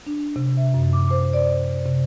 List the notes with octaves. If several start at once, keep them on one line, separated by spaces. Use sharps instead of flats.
D4
C3
E5
F#2
D6
C5
D5
C5
C3